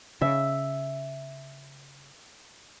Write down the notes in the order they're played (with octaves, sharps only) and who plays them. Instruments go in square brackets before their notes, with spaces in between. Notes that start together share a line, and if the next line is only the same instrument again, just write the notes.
[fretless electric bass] C#3 [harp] E5